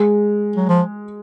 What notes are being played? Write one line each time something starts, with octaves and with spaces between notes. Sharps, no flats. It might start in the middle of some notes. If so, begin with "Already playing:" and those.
Already playing: G#3
F#3
F3